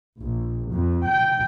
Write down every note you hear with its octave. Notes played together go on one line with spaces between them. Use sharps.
A#1
F2
G5